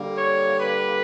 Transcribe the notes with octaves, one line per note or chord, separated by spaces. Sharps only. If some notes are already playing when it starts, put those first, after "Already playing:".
Already playing: D3 G3 A#3
C#5
B4